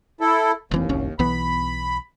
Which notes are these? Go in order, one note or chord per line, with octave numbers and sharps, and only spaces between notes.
E4 A4
F1 D#2 E3 C4
F#1 C2 C#4
B1 E3 B3 B5